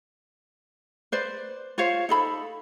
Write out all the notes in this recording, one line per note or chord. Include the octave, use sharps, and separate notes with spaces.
B4 C5 D5
F4 C5 C#5 F5
D#4 A4 B5